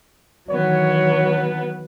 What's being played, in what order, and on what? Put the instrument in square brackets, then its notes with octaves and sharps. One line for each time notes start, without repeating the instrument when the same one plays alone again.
[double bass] D#3 E3 [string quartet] F#3 B3 [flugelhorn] C#5